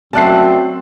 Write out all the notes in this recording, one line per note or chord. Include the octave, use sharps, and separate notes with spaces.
F#2 A3 C4 D5 E5 A5 F#6 C7